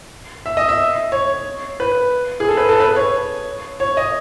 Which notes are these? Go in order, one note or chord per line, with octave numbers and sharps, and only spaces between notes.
E5
D#5
E5
C#5
B4
G#4
A4
B4
A4
B4
C#5
C#5
D#5